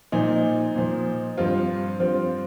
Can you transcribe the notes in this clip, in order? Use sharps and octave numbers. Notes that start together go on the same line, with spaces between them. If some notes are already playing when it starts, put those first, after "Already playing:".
A#2 F3 D#4
A#2 F3
G2 F3 C4 F4
G2 F3 C4 F4